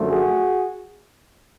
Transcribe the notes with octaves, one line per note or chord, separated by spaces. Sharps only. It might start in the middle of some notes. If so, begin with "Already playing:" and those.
Already playing: F#2 D3 F3 A3
F#4 G#4